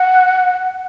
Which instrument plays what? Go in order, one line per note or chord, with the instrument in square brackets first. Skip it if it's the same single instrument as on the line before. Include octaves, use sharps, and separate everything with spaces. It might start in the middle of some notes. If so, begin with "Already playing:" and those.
Already playing: [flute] F#5